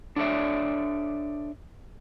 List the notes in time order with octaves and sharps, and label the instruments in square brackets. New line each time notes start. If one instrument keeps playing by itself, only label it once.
[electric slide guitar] D4 A4 C#5 D5 E5